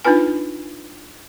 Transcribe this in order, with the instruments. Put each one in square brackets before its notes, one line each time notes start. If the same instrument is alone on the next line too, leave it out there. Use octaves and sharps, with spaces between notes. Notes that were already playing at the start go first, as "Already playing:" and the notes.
[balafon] D4 D#4 F4 B4 G#5